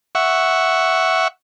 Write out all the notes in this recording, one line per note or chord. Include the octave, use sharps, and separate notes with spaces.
E5 F#5 C#6